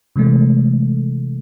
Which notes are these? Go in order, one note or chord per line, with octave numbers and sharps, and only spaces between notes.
C3 E3 G#3 A3